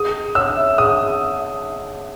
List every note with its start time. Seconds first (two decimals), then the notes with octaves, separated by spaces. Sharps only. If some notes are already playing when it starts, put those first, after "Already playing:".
Already playing: G#4 D#6
0.14 G#4
0.35 C#5 E6
0.57 E5
0.78 G#4 D#6